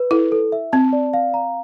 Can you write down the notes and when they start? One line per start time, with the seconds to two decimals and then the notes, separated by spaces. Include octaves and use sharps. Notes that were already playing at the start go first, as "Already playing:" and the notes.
Already playing: B4
0.11 E4 A4
0.32 A4
0.52 E5
0.73 C4 A5
0.93 D5
1.14 F5
1.34 A#5